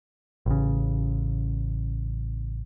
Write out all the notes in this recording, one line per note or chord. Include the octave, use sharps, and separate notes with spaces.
A1 C#3